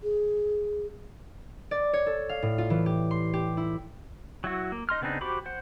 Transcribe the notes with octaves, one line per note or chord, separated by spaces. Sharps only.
G#4
D5
C#5
A4
F5
A2
F4
E3
G4
C6
G4
E4
F#3 E4 F#4
A#3
D#4 D#5 C6 F6
C#3 B3 C4 D4 D#4
F#4 G4 C5 B5 D6
C5 F#5